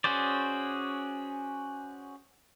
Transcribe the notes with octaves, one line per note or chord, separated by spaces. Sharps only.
C#4 F#4 G#4 C5 D5